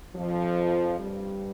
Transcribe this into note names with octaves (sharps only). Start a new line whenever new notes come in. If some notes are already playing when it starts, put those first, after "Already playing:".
F2 F3
G2 G3